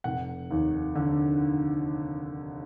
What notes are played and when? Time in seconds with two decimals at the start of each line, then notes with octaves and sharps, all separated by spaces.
0.04 F1 F#5
0.51 D#2
0.95 D3